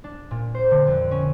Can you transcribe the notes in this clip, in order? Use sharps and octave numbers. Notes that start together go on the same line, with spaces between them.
D4
A#2
C5
D3
F2
C#4